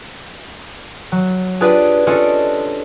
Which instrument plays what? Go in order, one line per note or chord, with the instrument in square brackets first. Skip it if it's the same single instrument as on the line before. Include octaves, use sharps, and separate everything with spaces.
[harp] F#3
D4 F4 G4 G#4 B4 D5
C#4 D4 F4 A4 D5 D#5